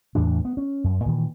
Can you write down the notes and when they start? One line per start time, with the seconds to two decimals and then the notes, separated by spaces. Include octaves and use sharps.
0.15 E2 A2 E3 D4
0.45 B3
0.57 C#4
0.84 F#2
1.06 A#2 D#3 E3